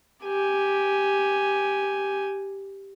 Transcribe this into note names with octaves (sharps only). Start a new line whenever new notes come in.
G4 G#5